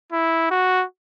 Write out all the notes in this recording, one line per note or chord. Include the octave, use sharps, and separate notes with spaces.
E4
F#4